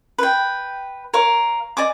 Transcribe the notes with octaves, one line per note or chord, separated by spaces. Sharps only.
B4 G5
A#4 C#5 F5
D5 D#5 G#5 D6